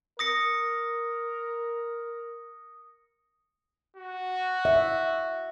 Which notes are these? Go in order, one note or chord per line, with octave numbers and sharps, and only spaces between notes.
A#4 D#6 A#6 C#7
F#4
E5